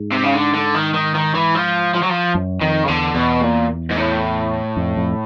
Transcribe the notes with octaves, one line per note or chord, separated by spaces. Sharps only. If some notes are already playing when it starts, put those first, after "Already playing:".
Already playing: G#2
C3
C#3
D3
D3
D#3
D#3
D#3
E3
F3
F3
F#3
F3
F#2
F2 D#3
C#3
E2 D3
E2 B2
A#2
G#2
A2
F2
F2